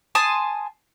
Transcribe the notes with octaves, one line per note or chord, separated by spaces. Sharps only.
G#5 A5 C6 D#6